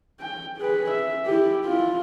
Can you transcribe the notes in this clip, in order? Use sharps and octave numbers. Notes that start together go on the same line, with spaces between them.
G5
G#4 B4
E5
E4 G4
E4 F4